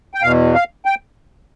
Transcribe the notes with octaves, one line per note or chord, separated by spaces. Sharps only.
G5
E2 B2 F5
F5
G5